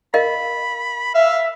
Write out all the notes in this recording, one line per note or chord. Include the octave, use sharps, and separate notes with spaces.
A#4 D#5 F5 B5
E5 F5